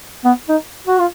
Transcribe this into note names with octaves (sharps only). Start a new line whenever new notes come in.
B3
D#4
F#4
F4